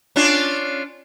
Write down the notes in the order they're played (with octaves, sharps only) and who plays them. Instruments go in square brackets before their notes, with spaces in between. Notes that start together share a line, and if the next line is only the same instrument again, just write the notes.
[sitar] C#4 D4 F4